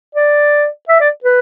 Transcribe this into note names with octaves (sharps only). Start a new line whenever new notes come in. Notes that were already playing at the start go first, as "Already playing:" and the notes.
D5
E5
D5
B4